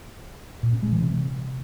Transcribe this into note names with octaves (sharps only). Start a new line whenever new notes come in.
A#2
C#4
G#3
E3
C3